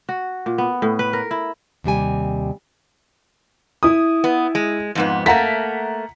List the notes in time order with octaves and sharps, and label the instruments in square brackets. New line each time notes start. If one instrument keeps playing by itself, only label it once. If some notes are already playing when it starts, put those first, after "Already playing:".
[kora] F#4
A#2
B3
A2
B4
A#4
E4
[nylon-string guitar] D#2 C3 G3 G#5
[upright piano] E4 D#6
[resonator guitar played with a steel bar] B3
G#3
F2 G#2 B3
[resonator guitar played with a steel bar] A3 A#3 [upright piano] F#5 A#5 B6